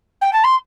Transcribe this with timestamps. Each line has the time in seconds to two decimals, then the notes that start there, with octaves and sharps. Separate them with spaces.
0.21 G5
0.33 A5
0.44 C6